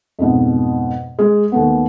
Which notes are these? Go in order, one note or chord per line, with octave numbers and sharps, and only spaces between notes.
F2 G#2 B2
G#3
D#2 A3 B3